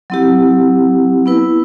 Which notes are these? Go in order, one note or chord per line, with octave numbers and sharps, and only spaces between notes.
F#3 C4 E4 G4
B3 E4 B4